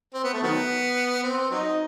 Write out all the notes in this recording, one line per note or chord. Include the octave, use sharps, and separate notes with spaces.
C4
B3
A3
D#3 F#3 B3
C4
F#3 C4 D#4